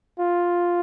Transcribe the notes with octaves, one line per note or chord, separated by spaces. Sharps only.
F4